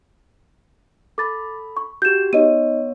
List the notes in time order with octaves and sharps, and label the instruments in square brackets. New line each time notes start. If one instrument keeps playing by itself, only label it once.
[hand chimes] A4 B5 [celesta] D6 A6
[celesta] C#6
[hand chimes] F#4 G4 [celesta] G6 E7
[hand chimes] B3 C#5 [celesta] D#4 D#5 D#7